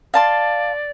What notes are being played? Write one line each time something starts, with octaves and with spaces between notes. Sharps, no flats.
D5 F5 A5 C6